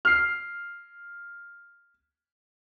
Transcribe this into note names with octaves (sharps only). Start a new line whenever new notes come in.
F6 C7